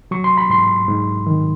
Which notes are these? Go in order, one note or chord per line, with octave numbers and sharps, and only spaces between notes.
F#3 C#6
C6
B5
G#2 C6
G#2
D#3